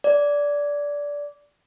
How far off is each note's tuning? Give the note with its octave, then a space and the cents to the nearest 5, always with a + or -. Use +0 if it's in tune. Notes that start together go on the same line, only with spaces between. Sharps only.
D5 -15